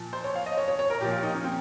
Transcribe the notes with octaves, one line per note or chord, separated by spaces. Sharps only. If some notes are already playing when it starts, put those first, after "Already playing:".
Already playing: A#2 F3
C5
C#5
F5
D#5
C#5
C#5
C#5
A#4
A#2 F3 G4
F4
D#4
C#4
C4